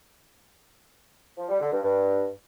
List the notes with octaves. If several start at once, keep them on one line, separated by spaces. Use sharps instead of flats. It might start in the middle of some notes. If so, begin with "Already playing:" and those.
F3
G3
D3
G2
G2